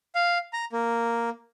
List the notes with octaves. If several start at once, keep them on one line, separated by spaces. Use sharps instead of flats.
F5
A#5
A#3